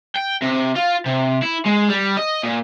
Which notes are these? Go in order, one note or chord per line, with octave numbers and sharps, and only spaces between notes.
G5
C3
F4
C3
E4
G#3
G3
D#5
A#2